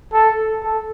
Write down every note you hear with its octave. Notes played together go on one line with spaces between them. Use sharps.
A4
A4